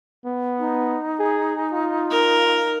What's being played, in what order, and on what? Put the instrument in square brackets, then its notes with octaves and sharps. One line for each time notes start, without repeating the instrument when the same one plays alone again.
[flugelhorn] B3
[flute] D#4
[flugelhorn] G#4
F4
[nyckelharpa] A#4